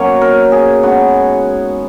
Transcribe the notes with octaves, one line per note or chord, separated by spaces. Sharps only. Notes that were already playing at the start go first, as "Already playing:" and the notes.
Already playing: B2 F#3 A#3 C#4 C#5
A#4
G#4
C#3 G#3 B3 D#4 F#4